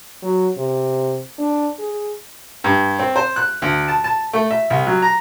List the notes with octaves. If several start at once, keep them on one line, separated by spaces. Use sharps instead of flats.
F#3
C3
D4
G#4
G2
C4
C5
F#6
D2
A5
A5
A3
E5
C2
F#3
A#5